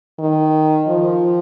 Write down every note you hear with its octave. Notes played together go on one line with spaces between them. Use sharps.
D#3
F3